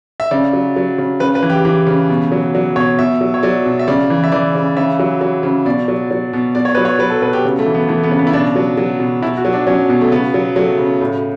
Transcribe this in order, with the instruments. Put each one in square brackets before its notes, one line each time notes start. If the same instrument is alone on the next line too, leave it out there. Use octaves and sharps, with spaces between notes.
[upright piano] E5
C#3 D5
F#3
F#3
C#3
C#3 B4
B4
E3
G4
E3 G4
C#3
B2
F#3
F#3
B2 C#5
B2 E5
F#3
C#5
F#3 D5
B2
E5
C#3 D5
E3
E5
E3 D5
C#3
C#3 E5
F#3
F#3
C#3
B2 D5
F#3
F#3
B2
B2 D5
C#5
F#3 B4
C#5
F#3 B4
A4
B2 B4
G4
C#3
A3
E3
B3
E3 A3
B3
C#3
B3
E4
B2 D4
F#3
F#3
B2
B2 E4
F#4
F#3
D4
F#3 C#4
B2
A3
C#3 B3
F#3
F#3 A3
C#3
A2